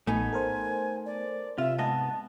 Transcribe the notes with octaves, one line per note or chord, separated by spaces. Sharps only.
A1 A3 B3 D#4 G#5
A4 A#4 C5
D5
C3 F4 E5
G#2 B3 D#5 A5